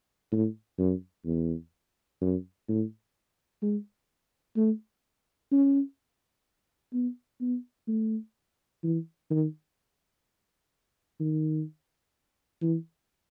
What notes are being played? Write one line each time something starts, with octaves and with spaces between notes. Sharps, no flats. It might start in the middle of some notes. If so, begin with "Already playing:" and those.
A2
F#2
E2
F#2
A2
G#3
A3
C#4
B3
B3
A3
E3
D#3
D#3
E3